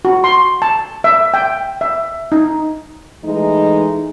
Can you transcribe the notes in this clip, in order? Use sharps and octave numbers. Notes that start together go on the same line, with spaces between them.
F#4
C6
A5
E5
G5
E5
D#4
E3 G#3 A3 D#4